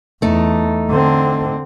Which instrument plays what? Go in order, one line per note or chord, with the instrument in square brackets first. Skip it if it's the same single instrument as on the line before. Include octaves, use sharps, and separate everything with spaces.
[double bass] E2 [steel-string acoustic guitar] A3 D#4
[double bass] D3 C4